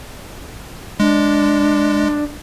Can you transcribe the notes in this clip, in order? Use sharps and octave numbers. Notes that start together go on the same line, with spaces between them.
G#3 D4